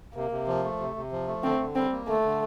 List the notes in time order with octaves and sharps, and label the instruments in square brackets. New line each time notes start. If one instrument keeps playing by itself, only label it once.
[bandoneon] C3 [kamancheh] A#3
[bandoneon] C3
F3
A3
C3
C3
F3
A3
[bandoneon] D3 [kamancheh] C4
[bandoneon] D3
[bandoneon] G3 [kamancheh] C4
[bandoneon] A#3
[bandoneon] D3 [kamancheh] A3
[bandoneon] D3